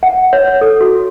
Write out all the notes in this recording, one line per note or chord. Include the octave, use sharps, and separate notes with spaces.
F#5
C#5
A4
F#4